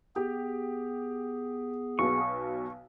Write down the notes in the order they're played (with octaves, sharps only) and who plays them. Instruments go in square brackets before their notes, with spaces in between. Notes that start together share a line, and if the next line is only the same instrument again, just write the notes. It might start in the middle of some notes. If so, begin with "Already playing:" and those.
[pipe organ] B3 G#4 [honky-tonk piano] G4
[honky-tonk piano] B1 B2 [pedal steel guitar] C#6